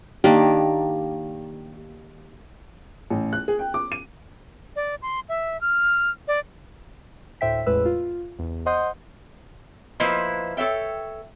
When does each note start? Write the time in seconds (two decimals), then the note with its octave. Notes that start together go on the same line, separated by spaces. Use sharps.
0.24 D#3 A#3 D4 G4
3.10 A1
3.33 F#6
3.48 G#4
3.59 G5
3.74 D6
3.92 D#7
4.76 D5
5.02 C6
5.29 E5
5.61 F6
6.28 D5
7.41 D2 A2 C5 E5 G5 B6
7.66 A1 E2 A2 G#3 B4 E6
7.85 F4
8.39 E2
8.66 C5 D#5 F#5 C6 D#6 G6
10.00 F3 A#3 E4 B4 C5 D#5
10.57 A4 C#5 E5 G5